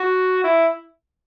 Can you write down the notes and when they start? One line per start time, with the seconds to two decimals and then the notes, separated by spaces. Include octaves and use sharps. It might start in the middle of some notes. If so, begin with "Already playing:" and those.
Already playing: F#4
0.44 E4